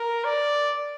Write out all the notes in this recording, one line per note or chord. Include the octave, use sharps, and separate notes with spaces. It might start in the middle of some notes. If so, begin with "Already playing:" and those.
Already playing: A#4
D5